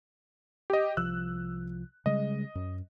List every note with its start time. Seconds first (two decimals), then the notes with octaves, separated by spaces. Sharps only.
0.70 G4 D#5
0.97 C2 F3 E6 F#6
2.06 C#3 G3 G#3 D#5
2.55 F#2